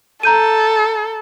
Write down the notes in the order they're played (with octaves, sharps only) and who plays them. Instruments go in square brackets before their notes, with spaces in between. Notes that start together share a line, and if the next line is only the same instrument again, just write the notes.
[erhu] A4 [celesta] A#5 G6 D#7